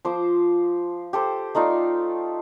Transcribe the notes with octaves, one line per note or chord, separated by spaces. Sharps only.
F3 C5 D6
G4 A4 C5
A3 D#4 F4 D5